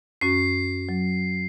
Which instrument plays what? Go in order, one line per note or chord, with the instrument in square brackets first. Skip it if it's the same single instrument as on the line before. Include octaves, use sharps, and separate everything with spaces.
[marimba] F#2 C#4 F#4 [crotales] C7
[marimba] F#3